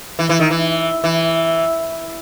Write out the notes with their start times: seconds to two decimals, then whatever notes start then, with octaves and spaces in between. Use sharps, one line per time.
0.19 E3
0.29 E3
0.40 D#3
0.51 E3
1.04 E3